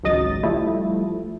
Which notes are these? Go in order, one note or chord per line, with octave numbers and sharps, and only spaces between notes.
G#1 C#2 F#3 D#5 D#6 A6
F3 G3 A3 E4